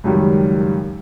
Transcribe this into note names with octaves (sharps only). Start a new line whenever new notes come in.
C#2 F#2 D#3 G3